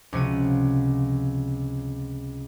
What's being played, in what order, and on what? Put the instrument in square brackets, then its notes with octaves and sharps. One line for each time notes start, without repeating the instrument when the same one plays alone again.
[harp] C#2 C3 F3 F#4 D#7